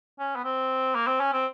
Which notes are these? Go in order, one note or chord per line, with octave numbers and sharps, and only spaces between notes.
C#4
B3
C4
A#3
C4
C#4
C4